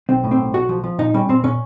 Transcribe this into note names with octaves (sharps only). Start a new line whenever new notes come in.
B1 C4
A2
C4
B1
B1 F#4
F3
F3
A#2 D#4
G3 C#4
A#2 C4
A#2 C#4